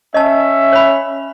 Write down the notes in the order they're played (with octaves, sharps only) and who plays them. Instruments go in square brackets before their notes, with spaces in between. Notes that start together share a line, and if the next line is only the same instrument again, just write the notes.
[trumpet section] C#4 E5 [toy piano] D#5 A5
[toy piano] C#5 B5